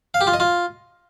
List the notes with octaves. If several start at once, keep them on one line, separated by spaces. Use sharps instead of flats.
F5
G4
F4
D#5
F4